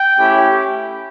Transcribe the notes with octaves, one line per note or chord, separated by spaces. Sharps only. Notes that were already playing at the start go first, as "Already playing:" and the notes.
Already playing: G5
A3 C#4 E4 G4